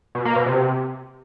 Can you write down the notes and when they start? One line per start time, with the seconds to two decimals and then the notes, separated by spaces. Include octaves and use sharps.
0.15 B2
0.25 A#3
0.36 B2
0.46 C3